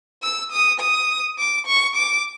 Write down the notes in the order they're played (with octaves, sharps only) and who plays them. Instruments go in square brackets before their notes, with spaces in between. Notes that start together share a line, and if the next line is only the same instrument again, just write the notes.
[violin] E6
D#6
D#6
D6
C#6
D6